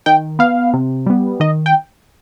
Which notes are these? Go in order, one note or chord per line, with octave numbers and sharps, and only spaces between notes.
D#3 G5
B3 F5
C3
G3 B3
D#3 D#5
G5